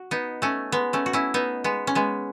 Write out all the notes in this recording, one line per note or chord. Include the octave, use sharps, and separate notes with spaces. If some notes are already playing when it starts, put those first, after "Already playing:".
Already playing: F#4
B3 D#4
A3 C#4
G#3 B3
A3 C#4
F#4
C#4 E4
B3 D#4
G#3 B3
C#4
G#3 B3